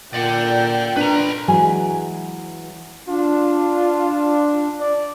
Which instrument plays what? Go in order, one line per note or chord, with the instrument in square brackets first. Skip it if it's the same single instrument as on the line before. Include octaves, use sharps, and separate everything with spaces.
[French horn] A#2 [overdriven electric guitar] D5 F#5 [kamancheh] G5
[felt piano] D4 [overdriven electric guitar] B4 A#5
[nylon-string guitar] E3 F#3 G#3 G#5
[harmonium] D4 [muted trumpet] F4
[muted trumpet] D5